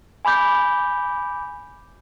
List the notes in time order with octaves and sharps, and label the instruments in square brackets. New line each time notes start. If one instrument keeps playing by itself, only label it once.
[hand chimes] G#5 B5 D6 G6